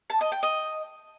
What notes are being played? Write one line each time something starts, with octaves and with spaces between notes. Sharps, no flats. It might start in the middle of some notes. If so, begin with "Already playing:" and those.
A5
D#5
G5
D#5